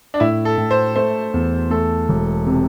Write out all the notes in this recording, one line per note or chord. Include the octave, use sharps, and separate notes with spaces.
D4
A2 E4
A4
A2
C5
A3 C5
E2
A3 A4
E1
C3